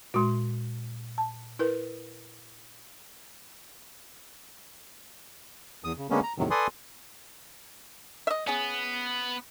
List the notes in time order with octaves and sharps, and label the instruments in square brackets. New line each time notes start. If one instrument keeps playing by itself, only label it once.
[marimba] A#2 C6 [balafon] G#3 F#4
[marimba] A5
[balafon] E4 A#4 B4
[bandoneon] E2 D#6
C#3
D3 G#3 A#3 B3 C#4
A#5
E2 A2 C3 D#3 F#3
A4 B4 D5 G#5 C6 D#6
[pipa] D#5 E5
[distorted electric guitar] B3 [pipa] C#4 G#4